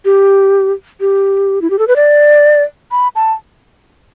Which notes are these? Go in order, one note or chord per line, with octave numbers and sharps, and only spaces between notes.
G4
G4
E4
G4
A4
B4
D5
B5
A5